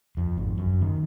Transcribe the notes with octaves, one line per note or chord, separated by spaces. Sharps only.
F2
G#1
F#2
D#3